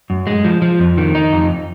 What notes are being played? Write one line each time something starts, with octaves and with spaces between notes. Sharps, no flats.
F#2
G#3
F3
F3
F2
D#3
D#4
F2